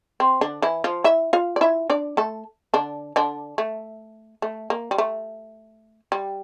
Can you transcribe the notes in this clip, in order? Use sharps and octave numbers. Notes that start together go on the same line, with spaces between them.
C4
D3 D4
E3 E4
F3 F4
E4 E5
F4 F5
D5
E4 E5
D4 D5
A3 A4
D3 D4
D3 D4
A3
A3
A#3
G3
A3
G3